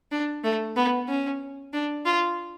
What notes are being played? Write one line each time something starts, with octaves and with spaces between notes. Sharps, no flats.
D4
A3
B3
C#4
D4
F4